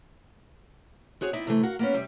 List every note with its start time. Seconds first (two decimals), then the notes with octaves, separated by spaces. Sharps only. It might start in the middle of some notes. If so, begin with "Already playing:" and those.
1.21 C4 F#4 G#4 C#5
1.33 B3 C4 D#4 E4 D5 E5
1.47 C3 E3 A3
1.63 F#4 A#4 F5 F#5
1.79 A#3 B3 C#4
1.94 C3 G3 G4